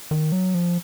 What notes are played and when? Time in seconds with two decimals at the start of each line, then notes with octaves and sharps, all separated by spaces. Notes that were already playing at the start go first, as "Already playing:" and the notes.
0.11 D#3
0.32 F#3
0.55 F3